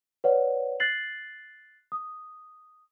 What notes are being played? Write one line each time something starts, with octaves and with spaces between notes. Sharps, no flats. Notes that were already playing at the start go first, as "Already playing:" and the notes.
B4 C#5 D5 F#5
F#6 A6 C7 F#7
D#6